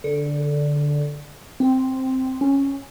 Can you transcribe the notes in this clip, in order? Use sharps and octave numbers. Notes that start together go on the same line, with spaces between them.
D3
C4
C#4